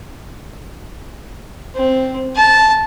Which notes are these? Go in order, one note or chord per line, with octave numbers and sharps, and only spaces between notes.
C4
A5